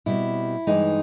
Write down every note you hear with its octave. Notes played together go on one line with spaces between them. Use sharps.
B2 G3 C4 E4
G2 E3 G#3 D#4